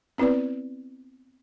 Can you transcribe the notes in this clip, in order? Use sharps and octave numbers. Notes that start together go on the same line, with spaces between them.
B3 C4 E4 B4 D5